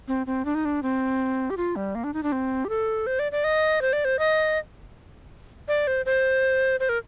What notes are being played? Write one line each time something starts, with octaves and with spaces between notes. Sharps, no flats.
C4
C4
D4
D#4
D4
C4
G4
F4
G3
A#3
D4
D#4
D4
C4
G4
A4
C5
D5
D5
D#5
C5
D5
C5
D#5
D5
C5
C5
C5
A#4